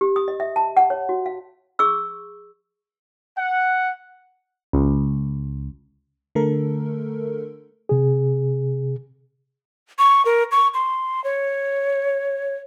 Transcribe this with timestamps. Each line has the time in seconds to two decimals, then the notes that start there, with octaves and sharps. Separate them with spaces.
0.01 G4
0.16 D#6
0.28 D#5
0.40 E5
0.56 A5
0.77 F#5
0.90 C#5
1.09 F#4
1.26 F5
1.79 G#4 C#6 E6
3.37 F#5
4.73 C#2
6.35 D3 A3 A4 A#4
7.89 C3 G#4
9.99 C#6
10.25 A#4
10.52 C#6
10.74 C6
11.24 C#5